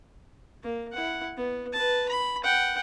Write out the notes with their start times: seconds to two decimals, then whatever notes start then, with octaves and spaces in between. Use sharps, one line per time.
0.63 A#3
0.93 E4 F#5
1.37 B3
1.73 B4 A5
2.09 B5
2.44 F#5 G5